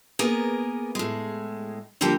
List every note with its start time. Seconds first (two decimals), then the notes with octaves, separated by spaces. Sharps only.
0.19 A#3 B3 G#4 A#4
0.95 A2 G#3
2.01 D3 F3 G3 A#3 G4